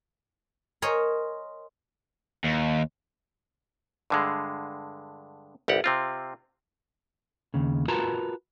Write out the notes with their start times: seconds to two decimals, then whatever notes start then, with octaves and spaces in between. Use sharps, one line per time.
0.82 A#4 C5 C#5 D#5 G#5 A#5
2.44 D#2
4.10 G2 D3 G#3
5.68 G1 C2 G4 F#5
5.84 C3 C4 F4
7.54 D#2 C#3
7.88 F4 F#4 A#4 B4 A5 A#5